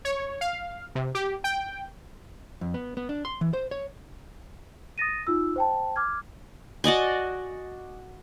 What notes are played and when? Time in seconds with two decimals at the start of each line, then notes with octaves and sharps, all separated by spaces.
0.05 C#5
0.41 F5
0.95 C3
1.15 G4
1.44 G5
2.61 F2
2.74 B3
2.97 B3
3.09 D4
3.25 C6
3.41 E3
3.53 C5
3.71 C#5
4.98 D#6 A6 A#6 D#7
5.27 D#4 F4 E6
5.56 C5 G5 A5
5.96 D6 F6 G#6
6.84 F#4 D5 D#5 G#5